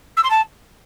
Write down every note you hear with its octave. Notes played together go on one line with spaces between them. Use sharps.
E6
C6
A5